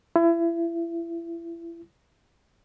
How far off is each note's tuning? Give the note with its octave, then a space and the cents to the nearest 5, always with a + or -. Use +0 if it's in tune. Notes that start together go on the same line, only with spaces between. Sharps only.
E4 +30